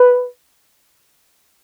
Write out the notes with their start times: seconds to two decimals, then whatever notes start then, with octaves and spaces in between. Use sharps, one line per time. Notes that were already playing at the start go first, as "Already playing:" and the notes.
Already playing: B4